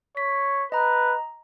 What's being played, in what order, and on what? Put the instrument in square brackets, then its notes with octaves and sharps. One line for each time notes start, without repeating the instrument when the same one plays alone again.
[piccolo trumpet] C#5 [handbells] B6
[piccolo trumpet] B4 [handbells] D#5 A#5